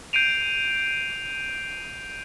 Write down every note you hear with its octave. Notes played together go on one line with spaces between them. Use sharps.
G6 C7 D7 D#7 F7